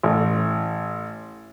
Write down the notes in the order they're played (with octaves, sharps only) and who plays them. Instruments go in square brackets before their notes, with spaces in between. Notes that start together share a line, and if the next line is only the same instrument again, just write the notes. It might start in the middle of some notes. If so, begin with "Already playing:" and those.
[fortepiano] A1